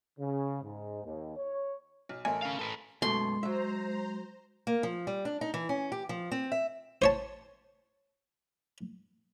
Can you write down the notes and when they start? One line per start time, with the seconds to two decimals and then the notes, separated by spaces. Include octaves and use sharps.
0.20 C#3
0.63 G#2
1.04 D#2
1.36 C#5
2.09 B1
2.25 A1 A3 A#4 G#5
2.42 C#4 F5
2.59 A4 B4
3.02 F#2 B2 G#3 A3 C6
3.43 F#3 C5 E5 A#5
4.67 A#3
4.83 F3
5.07 G3
5.25 D4
5.41 D#4
5.54 E3
5.69 C#4
5.92 G4
6.09 F3
6.32 C4
6.52 E5
7.02 C5 C#5 A5